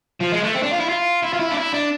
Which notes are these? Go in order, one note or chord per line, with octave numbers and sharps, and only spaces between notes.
F3
G#3
A3
C4
D4
F4
E4
F4
E4
F4
E4
D4
E4
D4